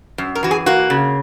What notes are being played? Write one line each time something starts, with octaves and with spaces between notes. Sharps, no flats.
F#2
A#4
E3 F#4
G#4
A#3 F#4
C#3